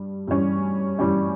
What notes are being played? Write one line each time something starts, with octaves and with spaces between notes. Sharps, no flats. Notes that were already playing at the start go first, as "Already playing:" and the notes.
Already playing: G2 G3
G2 E3 G3 C#4
G2 E3 G3 C#4